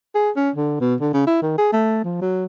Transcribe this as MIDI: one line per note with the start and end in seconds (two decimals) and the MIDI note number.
0.15 0.31 68
0.36 0.50 61
0.56 0.76 50
0.81 0.95 47
1.00 1.13 50
1.14 1.25 49
1.27 1.38 64
1.42 1.55 51
1.58 1.69 68
1.73 2.03 57
2.04 2.20 53
2.21 2.45 54